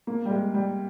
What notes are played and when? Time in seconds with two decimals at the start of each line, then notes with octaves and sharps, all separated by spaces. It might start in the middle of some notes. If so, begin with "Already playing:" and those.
0.07 A#3
0.25 G3
0.31 G#3
0.54 G3